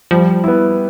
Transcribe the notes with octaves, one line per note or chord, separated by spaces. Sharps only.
F3 G3
B3 E4